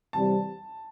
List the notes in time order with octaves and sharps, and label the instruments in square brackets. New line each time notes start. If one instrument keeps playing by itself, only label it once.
[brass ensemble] C3 E3 G3 C4 [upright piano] A5